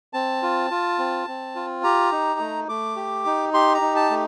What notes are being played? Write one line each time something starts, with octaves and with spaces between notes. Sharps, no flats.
C4 A5
F4
F4
C4
C4
F4
G4 A#5
D#4
A3
A3 D6
G4
D#4
G4 C6
A#5
D#4
A5
A3